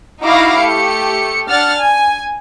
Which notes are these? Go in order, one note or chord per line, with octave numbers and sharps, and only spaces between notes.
D#4 E4 F#4 F5 D6 A#6
A3 G4 C#7
D4 F#5 F6 A6
G#5